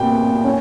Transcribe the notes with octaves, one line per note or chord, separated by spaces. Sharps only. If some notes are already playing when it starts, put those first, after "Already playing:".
Already playing: A#2 B3 G5
C#4